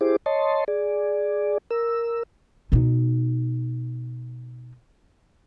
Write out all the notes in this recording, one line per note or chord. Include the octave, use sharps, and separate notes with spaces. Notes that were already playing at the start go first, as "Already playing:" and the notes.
E4 G4 G#4 C5 D6
C#5 D#5 A5 C6
G#4 D5
A#4 E6
B2 D#4